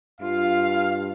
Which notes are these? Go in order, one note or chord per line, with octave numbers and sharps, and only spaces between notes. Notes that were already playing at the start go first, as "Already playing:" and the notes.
G2 F4 F5